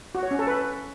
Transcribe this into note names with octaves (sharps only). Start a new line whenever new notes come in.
F#4
C#5
C#4
A4
B4